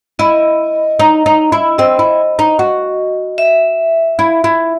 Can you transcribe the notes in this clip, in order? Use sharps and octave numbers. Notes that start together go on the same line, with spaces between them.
E4 D#5
D#4
D#4
E4
C4 D#5
E4
D#4
F#4
E5
E4
E4